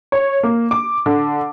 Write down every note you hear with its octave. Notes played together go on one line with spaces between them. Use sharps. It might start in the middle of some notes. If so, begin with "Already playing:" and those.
C#5
A#3
D6
D3